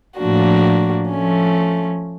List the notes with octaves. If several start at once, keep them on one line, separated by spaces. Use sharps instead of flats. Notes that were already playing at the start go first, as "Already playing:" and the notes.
A2 F3 A#3 D4 F#4
F3 A3 C#4